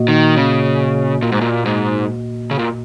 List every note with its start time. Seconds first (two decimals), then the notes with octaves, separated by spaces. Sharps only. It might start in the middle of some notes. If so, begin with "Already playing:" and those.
Already playing: A#2 A#3 F#4 D#5
0.08 D#3
0.37 C#3
1.22 A#2
1.32 G#2
1.41 A#2
1.65 G#2
2.51 C#3
2.59 A#2